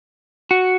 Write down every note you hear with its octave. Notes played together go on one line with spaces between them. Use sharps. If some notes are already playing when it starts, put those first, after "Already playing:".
F#4